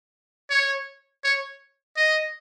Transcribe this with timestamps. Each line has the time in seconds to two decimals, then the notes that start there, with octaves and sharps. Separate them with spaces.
0.50 C#5
1.24 C#5
1.97 D#5